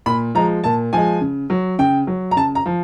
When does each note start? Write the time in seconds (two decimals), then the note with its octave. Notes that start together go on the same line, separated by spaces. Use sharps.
0.06 A#2 B5
0.35 F3 G#3 A#5
0.64 A#2 A5
0.93 F3 G#3 G#5
1.21 C#3
1.50 F#3
1.79 C#3 G5
2.07 F#3
2.31 A#5
2.36 C#3 A5
2.55 A#5
2.66 F3